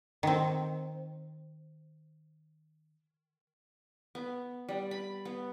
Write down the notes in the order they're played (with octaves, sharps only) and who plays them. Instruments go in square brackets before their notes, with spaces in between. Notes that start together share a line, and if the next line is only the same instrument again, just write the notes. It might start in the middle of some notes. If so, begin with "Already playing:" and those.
[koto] D#3 C4
[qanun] B3
G3
B5
B3